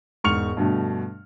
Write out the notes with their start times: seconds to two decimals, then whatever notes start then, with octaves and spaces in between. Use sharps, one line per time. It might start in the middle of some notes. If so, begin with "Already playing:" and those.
0.24 E1 G#2 C#6 F6 C#7 F7
0.57 G2 B2 D3 A3